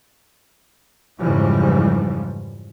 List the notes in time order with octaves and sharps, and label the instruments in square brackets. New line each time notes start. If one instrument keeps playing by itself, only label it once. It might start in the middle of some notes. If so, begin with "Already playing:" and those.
[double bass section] F2 G#2 C#3 E3 F3 G3